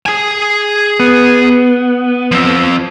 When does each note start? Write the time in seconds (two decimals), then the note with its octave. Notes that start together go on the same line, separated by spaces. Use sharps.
0.06 G#4 G#5
1.00 B3
2.32 F3 C4